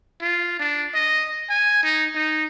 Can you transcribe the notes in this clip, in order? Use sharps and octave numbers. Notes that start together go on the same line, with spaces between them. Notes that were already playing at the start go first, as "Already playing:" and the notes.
F4
D4
D#5
G#5
D#4
D#4